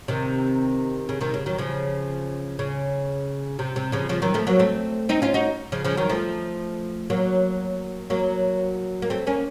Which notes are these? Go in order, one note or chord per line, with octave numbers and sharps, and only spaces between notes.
C3 D#3
C#3
C3 D#3
C#3
D#3 F#3
C#3 F3
C#3
C3
C3
C#3 F3
C#3 F3
D#3 F#3
F3 A3
F#3 A#3
A3 C4
C4 D#4
C#4 F4
D#4 F#4
C#3 F3
C#3 F3
D#3 F#3
F3 A3
F#3 A#3
F#3 A#3
A#3
A3 C4
A#3 C#4